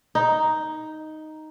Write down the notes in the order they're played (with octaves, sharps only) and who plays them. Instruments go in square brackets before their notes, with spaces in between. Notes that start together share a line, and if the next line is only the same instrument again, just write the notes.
[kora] D#4